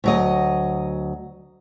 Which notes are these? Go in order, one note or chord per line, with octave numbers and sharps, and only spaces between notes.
D2 F#3 D#5